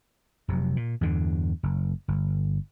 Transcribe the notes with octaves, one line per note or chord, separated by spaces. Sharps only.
F1 C3 F#3
A#2
E2 G2 B2 D3
F#1
G1